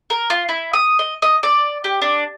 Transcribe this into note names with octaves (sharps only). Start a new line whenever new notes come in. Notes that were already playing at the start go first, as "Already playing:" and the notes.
A#4
F4
E4
D#6
D#5
D#5
D5
G4
D4